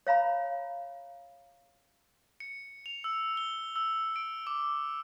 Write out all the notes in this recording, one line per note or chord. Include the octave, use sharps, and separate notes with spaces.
C#5 F5 A#5 B5
C#7
F7
E6
G7
E6
D7
D6